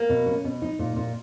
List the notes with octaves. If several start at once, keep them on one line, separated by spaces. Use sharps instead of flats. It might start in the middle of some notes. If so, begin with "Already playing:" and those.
Already playing: A#3
B2
C#4
B2
D#4
A#2
A#2